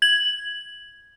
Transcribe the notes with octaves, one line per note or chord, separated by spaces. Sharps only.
G#6 F#7